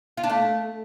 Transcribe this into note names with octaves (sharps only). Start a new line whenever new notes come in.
F4
D4
A3